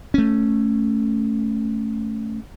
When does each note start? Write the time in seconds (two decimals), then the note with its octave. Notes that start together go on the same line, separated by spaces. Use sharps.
0.14 A3 C#4